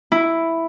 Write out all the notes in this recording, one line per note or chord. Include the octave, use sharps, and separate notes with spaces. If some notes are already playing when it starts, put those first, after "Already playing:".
E4